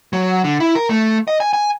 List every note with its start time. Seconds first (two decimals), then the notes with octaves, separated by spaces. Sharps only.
0.13 F#3
0.44 D3
0.60 E4
0.75 A#4
0.90 A3
1.28 D#5
1.40 G#5
1.53 G#5